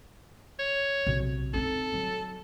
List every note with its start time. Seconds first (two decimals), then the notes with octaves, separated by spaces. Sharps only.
0.59 C#5
1.07 B1 C3
1.54 C4 D#4 A4
1.93 F#3